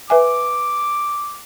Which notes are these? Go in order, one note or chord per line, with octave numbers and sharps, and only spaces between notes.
B4 E5 G#5 D6